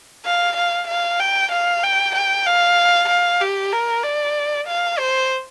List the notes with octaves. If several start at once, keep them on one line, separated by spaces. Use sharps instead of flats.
F5
F5
F5
G5
F5
G5
G5
F5
F5
G4
A#4
D5
F5
C5